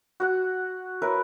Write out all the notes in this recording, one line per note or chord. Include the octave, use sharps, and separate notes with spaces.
F#4 F#5
E4 A#4 B4 C#5